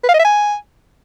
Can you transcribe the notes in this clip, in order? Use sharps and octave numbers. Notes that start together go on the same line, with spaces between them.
B4
F5
D#5
E5
G#5